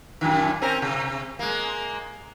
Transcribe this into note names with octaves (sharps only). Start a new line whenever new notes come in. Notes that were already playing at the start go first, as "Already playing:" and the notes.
F#2 A#2 D#3
C4 C#4 A#4
C3
G#3 A#3